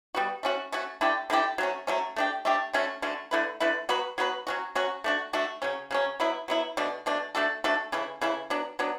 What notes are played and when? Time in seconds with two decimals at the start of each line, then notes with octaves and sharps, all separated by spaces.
0.15 G3 B3 F#4
0.43 A3 C#4 F#4
0.72 A3 C#4 F#4
1.01 D3 A3 E4 G4
1.30 D3 A3 E4 G4
1.58 F#3 A3 C#4
1.87 F#3 A3 C#4
2.16 A3 D4 G4
2.45 A3 D4 G4
2.73 D3 A3 C#4 F#4
3.02 D3 A3 C#4 F#4
3.31 D3 A3 E4 B4
3.60 D3 A3 E4 B4
3.89 F#3 B3 F#4 B4
4.18 F#3 B3 F#4 B4
4.47 F#3 C#4 F#4
4.75 F#3 C#4 F#4
5.04 A3 D4 F#4
5.33 A3 D4 F#4
5.62 C#3 F#3 C#4
5.91 C#3 F#3 C#4
6.20 F#3 B3 E4
6.48 F#3 B3 E4
6.77 B2 A3 D4
7.06 B2 A3 D4
7.35 A3 D4 F#4 A4
7.64 A3 D4 F#4 A4
7.92 C#3 E3 A3 E4
8.21 C#3 E3 A3 E4
8.50 F#3 B3 D4
8.79 F#3 B3 D4